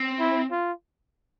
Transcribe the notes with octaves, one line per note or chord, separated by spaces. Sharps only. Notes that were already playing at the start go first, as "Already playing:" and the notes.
Already playing: C4
E4
F4